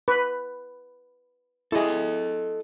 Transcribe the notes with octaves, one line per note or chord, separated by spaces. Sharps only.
B4
E4 G#4 A4 D#5